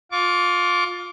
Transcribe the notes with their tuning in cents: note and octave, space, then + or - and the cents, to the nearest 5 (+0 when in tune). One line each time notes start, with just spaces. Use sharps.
F4 +20 D6 -30